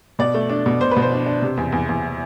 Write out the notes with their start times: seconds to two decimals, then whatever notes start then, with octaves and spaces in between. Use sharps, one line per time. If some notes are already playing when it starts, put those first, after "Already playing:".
0.19 B2 D5
0.34 A3
0.49 D4
0.66 B2
0.81 B2 C5
0.91 B4
0.96 B2
1.02 C5
1.12 D4
1.26 D4
1.42 C3
1.57 E2
1.72 E2
1.89 E2